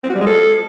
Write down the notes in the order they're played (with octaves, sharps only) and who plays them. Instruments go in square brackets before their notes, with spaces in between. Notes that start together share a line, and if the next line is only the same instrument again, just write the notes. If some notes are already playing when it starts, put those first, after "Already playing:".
[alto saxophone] C4
F#4
G3
G#3
A4